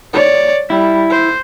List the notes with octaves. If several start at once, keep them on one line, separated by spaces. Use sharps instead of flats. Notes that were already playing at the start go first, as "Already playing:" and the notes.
C#5 D5
G3 E4
C5